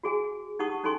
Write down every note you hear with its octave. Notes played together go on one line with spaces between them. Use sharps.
F#4 G#4 G#5
D#4 G4 F#5 A5 C#6 D#6
C#4 D#4 A4 G#5 C6 C#6